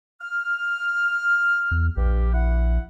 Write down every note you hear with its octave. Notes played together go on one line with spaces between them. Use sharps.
F6
E2
A#1 G2 G4
E4 F#5